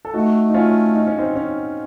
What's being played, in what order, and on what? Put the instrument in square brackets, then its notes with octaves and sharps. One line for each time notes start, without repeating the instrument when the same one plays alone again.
[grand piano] A4
[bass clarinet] A3 [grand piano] D#4 F#4
[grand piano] D#4
C#4 F4
D#4
C#4
C4 D#4
C#4